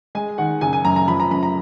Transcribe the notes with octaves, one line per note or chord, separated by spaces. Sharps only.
G#3 G#5
D#3 F#5
F#1 G#5
G#5
F#2 A#5
A#5
F3 B5
A#5
F#2 B5
A#5